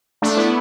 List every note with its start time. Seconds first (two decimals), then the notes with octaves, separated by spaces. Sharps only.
0.22 A3 D4
0.37 B3 E4